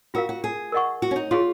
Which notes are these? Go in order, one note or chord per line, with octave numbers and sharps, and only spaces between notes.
F4 F#4 A#4 F5
F#4
G#4
A#4 D#5 F#5 C#6
F#4
C#4
D#4
F4 G#4 C#5 F5 C6